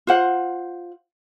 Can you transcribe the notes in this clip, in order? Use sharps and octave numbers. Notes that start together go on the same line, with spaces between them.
F4 C5 F#5